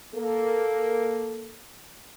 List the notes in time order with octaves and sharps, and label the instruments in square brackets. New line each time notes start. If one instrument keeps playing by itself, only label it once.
[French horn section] A#3 A4